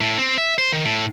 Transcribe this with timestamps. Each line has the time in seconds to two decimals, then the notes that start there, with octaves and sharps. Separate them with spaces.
0.01 A2
0.18 C4
0.38 E5
0.58 C5
0.72 D#3
0.85 A2